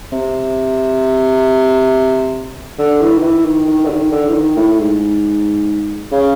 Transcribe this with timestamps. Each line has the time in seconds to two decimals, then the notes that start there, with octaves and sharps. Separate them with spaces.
0.12 C3
2.79 D3
3.01 E3
3.18 D#3
3.23 E3
3.45 D#3
3.67 D#3
3.85 D3
3.90 D#3
4.12 D3
4.28 E3
4.34 D#3
4.56 A2
4.79 G#2
6.12 C#3